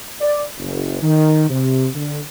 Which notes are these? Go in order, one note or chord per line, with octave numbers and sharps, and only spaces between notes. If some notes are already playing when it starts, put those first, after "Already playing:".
D5
F#1
D#3
C3
D3